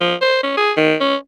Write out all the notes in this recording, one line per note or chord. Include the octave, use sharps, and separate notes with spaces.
F3
C5
C#4
G#4
D#3
C#4